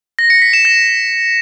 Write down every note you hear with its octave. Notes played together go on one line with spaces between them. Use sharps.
A#6
C#7
B6
E7
A#6